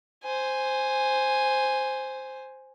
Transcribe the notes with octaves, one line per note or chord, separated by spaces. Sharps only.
C5 G#5